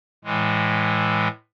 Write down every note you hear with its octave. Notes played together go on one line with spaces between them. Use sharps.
A2 E3 G#3